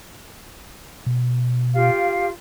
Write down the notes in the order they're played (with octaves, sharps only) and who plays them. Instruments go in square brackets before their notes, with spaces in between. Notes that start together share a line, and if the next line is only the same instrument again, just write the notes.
[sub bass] B2
[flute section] F4 G4 F5